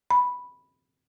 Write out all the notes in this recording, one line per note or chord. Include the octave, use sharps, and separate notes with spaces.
B5